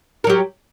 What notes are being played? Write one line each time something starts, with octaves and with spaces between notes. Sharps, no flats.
F#3 G4 A#4